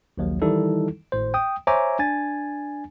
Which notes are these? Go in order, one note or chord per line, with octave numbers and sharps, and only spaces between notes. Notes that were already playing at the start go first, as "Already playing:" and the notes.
A#1 D#2 F#3
D#3 E3 G3 D#4 E4 A4
G#1 A2 C5
G5 D#6
C5 C#5 E5 G#5 A#5 D6
D4 G#5 A6